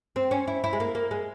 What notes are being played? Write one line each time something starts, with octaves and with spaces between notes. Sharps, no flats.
C4
C#4
E4
E4
G#3
A#3
A#3
G#3